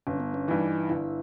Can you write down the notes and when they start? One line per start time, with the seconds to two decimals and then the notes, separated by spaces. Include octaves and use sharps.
0.07 G1 C#4
0.20 B3
0.34 C#4
0.48 G2 E3 D#4
0.89 G1 E4